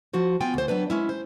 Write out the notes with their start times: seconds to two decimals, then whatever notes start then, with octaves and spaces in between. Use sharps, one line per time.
0.13 F3 F4 F#4 C5
0.41 B3 F4 G5 G#5
0.54 D2 C5
0.68 F#3 B3 D4 B4
0.90 G#3 C#4 E4
1.09 C5